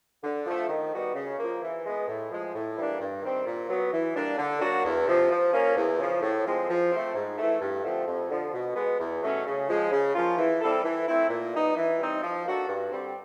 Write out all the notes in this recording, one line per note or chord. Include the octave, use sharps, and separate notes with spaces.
D3
F3 A3
D#3
G3 B3 D#4 F#4
C#3
F3 A#3
E3
G#3 B3
A2
F3 G#3
A2
E3 G3 A#3 D4
G2
D#3 G3 C4
A#2
F#3 B3
E3
G3 A#3 D4
D3
F#3 A#3 D4 F#4
E2
C3 F3
F3
A#3 C#4
E2
C#3 F3
A2
F3 G#3 C4
F3
A3 C4
G#2
E3 A3
G2
D3 F3 A3 C4
F2
D3 F3
B2
G#3 B3
E2
B2 F#3 A3 C#4
C#3
F3 G#3
C#3
F3 A#3 C#4 F4
E3
G3 C4 E4 A4
E3
A3 C4 E4
A#2
G3 B3 D#4
E3
G3 C4 D#4
F3
A#3 D4 F#4 A4
G2
D3 G3 C4